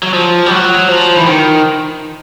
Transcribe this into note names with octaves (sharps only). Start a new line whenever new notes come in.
F#3
F3
G3
F#3
F3
E3
D#3